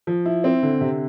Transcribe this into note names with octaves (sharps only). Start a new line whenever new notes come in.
F3
E4
C4
D3
C3